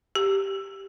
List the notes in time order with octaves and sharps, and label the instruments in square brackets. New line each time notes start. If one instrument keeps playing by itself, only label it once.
[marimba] G4